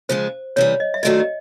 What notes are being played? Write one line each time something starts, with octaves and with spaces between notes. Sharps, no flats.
C#3 F3 G#3 C5
C3 E3 G3 C#5
D#5
E5
D#3 F#3 A3 D4 F4 D#5
D#5